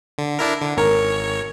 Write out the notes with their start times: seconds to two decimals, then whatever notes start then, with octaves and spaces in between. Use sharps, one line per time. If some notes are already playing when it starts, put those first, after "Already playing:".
0.18 D3
0.39 D4 E4 A#4
0.62 D3
0.77 G#1 A#4 C#5